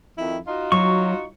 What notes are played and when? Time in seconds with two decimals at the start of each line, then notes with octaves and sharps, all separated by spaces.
0.17 F2 D#3 E4
0.47 D#4 F4 F#4
0.72 F#3 C#6